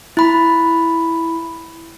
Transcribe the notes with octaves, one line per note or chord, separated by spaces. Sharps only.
E4 B5